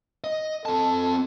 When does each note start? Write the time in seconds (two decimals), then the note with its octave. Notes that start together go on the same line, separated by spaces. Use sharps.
0.24 D#5
0.65 C4 A4 A5